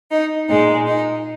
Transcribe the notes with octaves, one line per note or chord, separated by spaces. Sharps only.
D#4
A#2 G#3 D#4
D#4